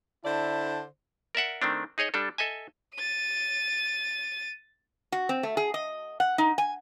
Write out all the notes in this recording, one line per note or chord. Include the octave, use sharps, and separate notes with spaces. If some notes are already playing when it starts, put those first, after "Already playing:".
D3 E4 C5 D5 A5
A#4 D5 E5 F#5
D#3 A3 C4 D4
D#4 G#4 C#5 D#5
G3 D4 A4
A4 D#5 E5 G#5
A6 D#7
F#4
C4
A3
G#4
D#5
F#5
D#4
G#5